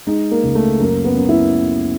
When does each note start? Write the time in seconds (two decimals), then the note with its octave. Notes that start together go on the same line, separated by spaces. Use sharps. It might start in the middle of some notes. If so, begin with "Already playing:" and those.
0.07 G#3 D#4
0.31 A#3
0.43 C#2
0.55 A3
0.80 F#2 A#3
1.05 B3
1.16 F#2
1.29 E4